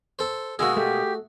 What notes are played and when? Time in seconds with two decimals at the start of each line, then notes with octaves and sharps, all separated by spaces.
0.19 A4 C5
0.59 B2 G#3 A#3 F#4 G#4 E6
0.77 A3 G4